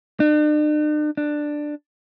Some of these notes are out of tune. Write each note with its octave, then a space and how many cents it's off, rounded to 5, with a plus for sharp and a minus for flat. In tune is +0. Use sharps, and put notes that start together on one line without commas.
D4 +45
D4 +10